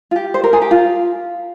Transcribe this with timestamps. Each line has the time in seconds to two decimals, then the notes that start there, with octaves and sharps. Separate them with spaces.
0.11 F4
0.16 G4
0.34 C5
0.44 A#4
0.53 G#4
0.62 G4
0.71 F4